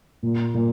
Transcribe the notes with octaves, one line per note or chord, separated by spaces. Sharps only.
A#2
A#2